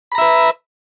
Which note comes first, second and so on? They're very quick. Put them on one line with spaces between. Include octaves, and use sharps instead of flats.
B5 A#5 E5 B4